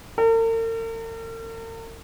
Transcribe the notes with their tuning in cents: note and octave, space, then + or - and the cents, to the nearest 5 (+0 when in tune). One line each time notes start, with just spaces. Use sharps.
A#4 -45